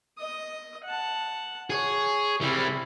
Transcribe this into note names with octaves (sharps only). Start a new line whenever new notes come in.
D#5 D#6
F#5 A5
G#4 C#5
C3 G3 E4